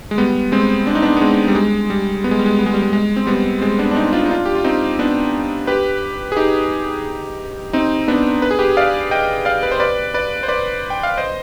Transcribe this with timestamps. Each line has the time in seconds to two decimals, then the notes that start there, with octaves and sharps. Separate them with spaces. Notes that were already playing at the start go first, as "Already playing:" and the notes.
0.11 G#3
0.18 G3 B3
0.52 G#3 C4
0.87 D4
0.95 D#4
1.02 B3 D4
1.17 B3
1.21 G#3 C4
1.48 G3
1.55 G#3
1.90 G3
2.24 B3
2.31 G#3
2.39 G3
2.46 G#3
2.59 B3
2.66 G#3
2.74 G3
2.82 G#3
2.93 G#3
3.16 C4
3.27 G3 B3
3.61 G#3 C4
3.79 B3 D4
3.91 D4
3.96 C4 D#4
4.13 D4 F4
4.26 D#4
4.30 D4 F4
4.45 G4
4.55 F4
4.64 C4 D#4
4.99 B3 D4
5.67 G4 B4
6.32 G#4
6.37 D#4 G4
7.73 C4 D#4
8.08 B3 D4
8.42 B4
8.51 G#4
8.59 G4 B4
8.77 D5 F5
9.11 D#5 G5
9.45 D5 F5
9.63 B4
9.71 C5
9.80 B4 D5
10.14 B4 D5
10.43 C5
10.48 B4 D5
10.90 G5
11.03 F5
11.18 C5 D#5